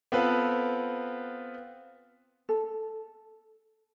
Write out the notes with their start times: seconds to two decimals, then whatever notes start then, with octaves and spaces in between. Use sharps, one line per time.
0.12 B3 C4 F4 A4 B4
2.49 A4